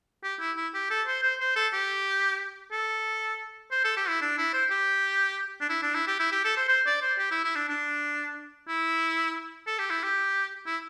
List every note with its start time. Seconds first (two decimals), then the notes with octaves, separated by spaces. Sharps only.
0.24 G4
0.40 E4
0.57 E4
0.74 G4
0.90 A4
1.07 C5
1.23 C5
1.40 C5
1.56 A4
1.73 G4
2.72 A4
3.71 C5
3.84 A4
3.97 G4
4.08 E4
4.22 D4
4.38 E4
4.54 C5
4.70 G4
5.61 D4
5.69 E4
5.82 D4
5.94 E4
6.07 G4
6.20 E4
6.32 G4
6.44 A4
6.57 C5
6.69 C5
6.86 D5
7.02 C5
7.19 G4
7.31 E4
7.44 E4
7.55 D4
7.69 D4
8.68 E4
9.67 A4
9.79 G4
9.90 E4
10.03 G4
10.66 E4